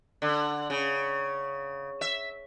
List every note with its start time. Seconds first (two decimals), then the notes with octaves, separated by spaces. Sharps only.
0.22 D3
0.70 C#3
2.01 E5